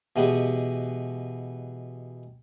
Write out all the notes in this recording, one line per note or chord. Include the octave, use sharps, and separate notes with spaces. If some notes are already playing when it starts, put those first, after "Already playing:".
B2 E3 G#3 B3 G4 G#4